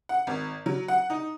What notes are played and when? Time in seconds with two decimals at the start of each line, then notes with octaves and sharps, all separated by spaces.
0.09 F#5
0.27 G#1
0.66 F#3
0.88 F#5
1.10 D#4